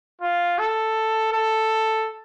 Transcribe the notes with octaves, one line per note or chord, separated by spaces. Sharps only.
F4
A4
A4